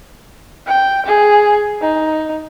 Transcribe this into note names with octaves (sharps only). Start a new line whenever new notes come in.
G5
G#4
D#4